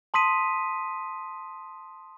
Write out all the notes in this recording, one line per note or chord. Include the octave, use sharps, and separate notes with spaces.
A5 C6 D#6 B6 D#7